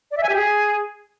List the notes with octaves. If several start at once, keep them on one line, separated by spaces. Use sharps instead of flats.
D5
E5
G#5
G4
G#4